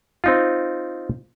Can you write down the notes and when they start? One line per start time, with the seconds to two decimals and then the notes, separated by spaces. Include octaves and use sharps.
0.24 C4 D#4 F4